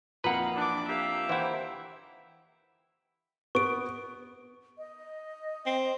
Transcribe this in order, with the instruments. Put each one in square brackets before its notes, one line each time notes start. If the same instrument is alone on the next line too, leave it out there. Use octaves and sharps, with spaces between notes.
[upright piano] A#1 F2 A#5 [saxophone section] A#3 D#4 A#4 [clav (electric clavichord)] B4 F#5
[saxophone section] E3 [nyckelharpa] D4 D6
[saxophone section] A#3 G4 [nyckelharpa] E5
[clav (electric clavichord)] E3 E4 [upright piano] C5 F#5 G5
[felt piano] B3 [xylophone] C#6 D7
[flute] D#5
[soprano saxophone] C4